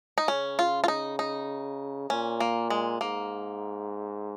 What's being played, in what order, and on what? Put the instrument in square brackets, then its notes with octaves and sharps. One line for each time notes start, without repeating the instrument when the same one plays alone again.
[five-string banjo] D#4
[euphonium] C#3 [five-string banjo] C#4
[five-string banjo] F4
F4
D#4
D#4
[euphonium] A#2 [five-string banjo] C#4
[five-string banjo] A#3
G#3
[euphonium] G#2 [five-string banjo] A#3